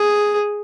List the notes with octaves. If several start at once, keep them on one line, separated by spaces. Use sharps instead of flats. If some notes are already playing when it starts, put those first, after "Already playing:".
Already playing: G#4